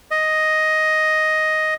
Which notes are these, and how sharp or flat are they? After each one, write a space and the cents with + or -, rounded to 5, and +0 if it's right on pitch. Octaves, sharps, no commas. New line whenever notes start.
D#5 +5